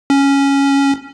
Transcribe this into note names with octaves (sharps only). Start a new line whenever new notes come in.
C#4